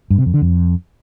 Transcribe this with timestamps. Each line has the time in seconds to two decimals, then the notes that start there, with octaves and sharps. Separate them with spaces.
0.10 G2
0.18 C3
0.26 F2
0.34 D3
0.42 F2